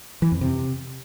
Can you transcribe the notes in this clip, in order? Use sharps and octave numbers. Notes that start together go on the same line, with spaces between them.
E3
F2
C3